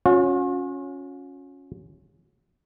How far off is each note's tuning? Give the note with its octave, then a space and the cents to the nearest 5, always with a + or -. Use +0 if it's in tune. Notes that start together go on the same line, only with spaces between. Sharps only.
C#4 +0 F#4 -45